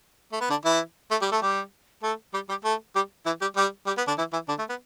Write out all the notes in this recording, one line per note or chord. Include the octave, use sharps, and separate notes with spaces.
A3
B3
D3 D4
E3 E4
A3 A4
G3 G4
A3 A4
G3 G4
A3 A4
G3 G4
G3 G4
A3 A4
G3 G4
E3 E4
G3 G4
G3 G4
G3 G4
B3
D3 D4
E3 E4
E3 E4
D3 D4
A3
B3